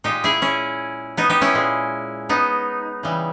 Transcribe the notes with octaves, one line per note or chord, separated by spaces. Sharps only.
A#2 G#3 D#4 G4
E4 G#4
C#4 E4
B3 D#4
D#4 G4
C#4 E4
A#2 G#3
B3 D#4
C#3 E3 G3